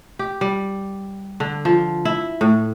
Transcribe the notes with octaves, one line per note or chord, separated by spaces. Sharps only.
G4
G3
D3
F3
E4
A2